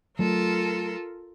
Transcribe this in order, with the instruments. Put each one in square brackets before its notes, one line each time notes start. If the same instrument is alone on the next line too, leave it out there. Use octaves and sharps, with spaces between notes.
[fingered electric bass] F#3 A3 [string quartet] F4 A4 A#4